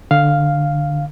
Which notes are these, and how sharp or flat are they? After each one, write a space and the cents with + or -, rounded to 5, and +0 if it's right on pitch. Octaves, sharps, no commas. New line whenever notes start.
D3 +10 F5 +0